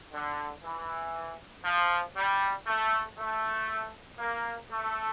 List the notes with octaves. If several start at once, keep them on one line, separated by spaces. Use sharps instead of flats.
D3
E3
F3
G3
A3
A3
A#3
A3